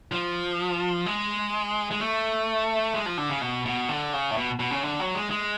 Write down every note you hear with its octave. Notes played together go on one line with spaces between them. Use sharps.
F3
G#3
G#3
A3
G#3
F3
D3
C#3
B2
B2
D3
C#3
A2
B2
B2
C#3
D3
F#3
G#3
G#3